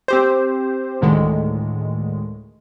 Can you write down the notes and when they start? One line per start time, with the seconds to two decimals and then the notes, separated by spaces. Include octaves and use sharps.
0.08 C4 G4 C5
1.01 D2 A2 D3 D#3 G#3